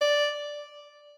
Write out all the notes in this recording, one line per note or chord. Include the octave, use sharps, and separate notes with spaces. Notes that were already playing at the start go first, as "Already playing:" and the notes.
D5